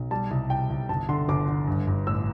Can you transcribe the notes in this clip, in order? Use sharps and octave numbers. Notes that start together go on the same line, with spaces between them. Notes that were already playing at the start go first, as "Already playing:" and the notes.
Already playing: B1
G3 A5
C2
C2 G5
C2
G1 A5
D3 C6
G1 D6
D3
G2
G2
A1 E6